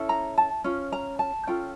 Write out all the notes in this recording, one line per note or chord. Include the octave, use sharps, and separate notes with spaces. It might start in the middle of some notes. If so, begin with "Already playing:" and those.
Already playing: C#4 E4 A4
A#5
A5
C#4 F4
A#5
A5
C#4 F4 A4 G5